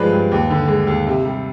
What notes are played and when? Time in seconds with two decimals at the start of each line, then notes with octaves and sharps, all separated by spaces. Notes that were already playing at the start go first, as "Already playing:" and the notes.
Already playing: G2 F3 G#3 B4 D5
0.12 G2
0.32 D#2
0.50 D3
0.68 G#3
0.87 D#2
1.07 C3
1.25 G3